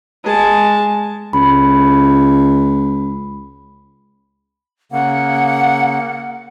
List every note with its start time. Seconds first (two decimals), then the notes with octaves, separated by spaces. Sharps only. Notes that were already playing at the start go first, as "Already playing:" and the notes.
0.24 G#3 A5
1.33 C#2 B5
4.92 C#3 A#3 F#5